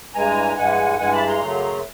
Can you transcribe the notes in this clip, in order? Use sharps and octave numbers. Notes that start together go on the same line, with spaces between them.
G2 E3 G#3 G#5 A#5
G2 E3 G#3 F#5 G#5
G2 E3 G#3 F#5 G#5
A5 B5
A#5 C6
F#2 C#3 F#3 A3